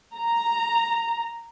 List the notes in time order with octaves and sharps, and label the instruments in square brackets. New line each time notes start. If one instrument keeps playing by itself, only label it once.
[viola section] A#5